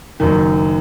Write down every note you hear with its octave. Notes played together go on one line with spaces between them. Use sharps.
F#1 F#2 D#3